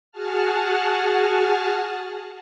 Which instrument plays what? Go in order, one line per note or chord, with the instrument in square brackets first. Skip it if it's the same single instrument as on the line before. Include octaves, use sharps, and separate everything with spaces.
[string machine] F#4 G#4 F#5 A5 F6